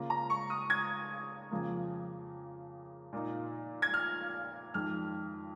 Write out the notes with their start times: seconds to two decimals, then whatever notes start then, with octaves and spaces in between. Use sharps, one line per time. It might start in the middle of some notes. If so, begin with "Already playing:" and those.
Already playing: C#3 A#3 F4
0.10 A#5
0.30 C#6
0.50 D#6
0.70 G#6
1.51 F2 C#3 F3 A#3
3.13 A#2 A#3 D#4
3.82 G#6
3.94 F6
4.74 F2 D#3 G#3 F6